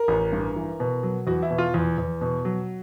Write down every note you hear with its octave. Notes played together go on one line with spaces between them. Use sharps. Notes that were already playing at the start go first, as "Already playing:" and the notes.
Already playing: A#4
A1
G2
E3
B2
F#3
E2 F#4
E4
B2
F4
E2
E2
B2
F#3